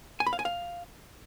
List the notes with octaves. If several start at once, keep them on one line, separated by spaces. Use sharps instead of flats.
G#5
B5
F5
G#5
F5